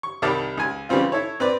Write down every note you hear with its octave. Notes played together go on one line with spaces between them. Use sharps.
C#6
C2 D#3 G3 A5 D6
C#2 G#5
C#3 E3 G3 C4 F4
E4 A4 C#5
C4 B4 D5